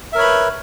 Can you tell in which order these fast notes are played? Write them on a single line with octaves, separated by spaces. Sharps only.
E5 A#4 C#5 B5 B4